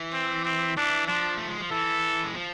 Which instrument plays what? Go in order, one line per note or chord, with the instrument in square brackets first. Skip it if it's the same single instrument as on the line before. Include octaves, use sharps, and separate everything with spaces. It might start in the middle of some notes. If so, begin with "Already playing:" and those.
Already playing: [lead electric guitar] E3
[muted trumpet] C4
C4
[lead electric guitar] E3 [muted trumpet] D4
[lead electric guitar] F3 [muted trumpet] D4
[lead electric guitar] A3
G#3
F3
[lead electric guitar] E3 [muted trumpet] A4
[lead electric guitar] G#3
F3